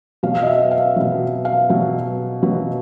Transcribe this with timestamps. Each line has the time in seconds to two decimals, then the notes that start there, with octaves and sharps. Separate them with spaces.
0.23 B2 F#3 F5
0.42 D#5
0.47 E5
0.71 F5
0.96 B2 F#3
1.45 F5
1.70 B2 F#3
2.43 B2 F#3